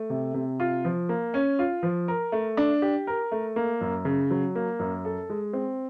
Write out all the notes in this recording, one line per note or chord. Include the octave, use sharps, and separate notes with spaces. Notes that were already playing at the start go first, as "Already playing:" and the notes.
Already playing: A3
C3
C3
F4
F3
A#3
C#4
F4
F3
A#4
A3
D4
G4
A#4
A3
A#3
F#2
C#3
F#3
A#3
F#2
A4
G#3
C4